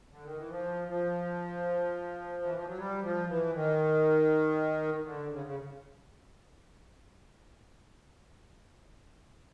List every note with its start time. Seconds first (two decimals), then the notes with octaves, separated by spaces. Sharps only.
0.11 D3
0.24 D#3
0.37 E3
0.50 F3
0.88 F3
2.42 E3
2.54 F3
2.66 F#3
2.77 G3
3.03 F3
3.28 E3
3.53 D#3
5.05 D3
5.30 C#3
5.45 C#3